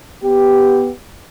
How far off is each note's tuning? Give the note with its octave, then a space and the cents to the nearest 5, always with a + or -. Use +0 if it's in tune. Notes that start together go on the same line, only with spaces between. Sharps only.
B3 +0 G4 +5